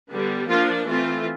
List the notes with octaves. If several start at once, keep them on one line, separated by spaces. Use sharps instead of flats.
D3 G3 B3
F3 A#3 D4 F4
E3 A3 C4 F4